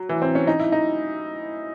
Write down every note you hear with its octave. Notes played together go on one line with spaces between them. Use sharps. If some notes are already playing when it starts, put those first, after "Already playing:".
Already playing: F#3
E3
C4
C#4
D#4
E4
D#4